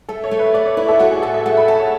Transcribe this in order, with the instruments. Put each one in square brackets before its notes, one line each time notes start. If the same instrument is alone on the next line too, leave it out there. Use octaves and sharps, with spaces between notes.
[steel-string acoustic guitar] A3 [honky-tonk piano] A4
[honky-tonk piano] C#5
[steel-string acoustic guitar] A3
[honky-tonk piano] B4
[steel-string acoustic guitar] A3 [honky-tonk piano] D5
[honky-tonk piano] C#5
[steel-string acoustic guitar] E4 [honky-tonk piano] B4
[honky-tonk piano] A4
[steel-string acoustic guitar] A3 [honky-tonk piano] F#4
[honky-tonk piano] G#4
[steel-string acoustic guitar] A2 [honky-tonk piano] A4
[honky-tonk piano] E5
[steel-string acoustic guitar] A3 [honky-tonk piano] F#5
[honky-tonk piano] B5
[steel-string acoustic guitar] C#4 [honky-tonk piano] A5
[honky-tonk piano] C#5